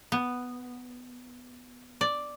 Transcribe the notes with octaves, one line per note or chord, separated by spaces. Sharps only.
B3
D5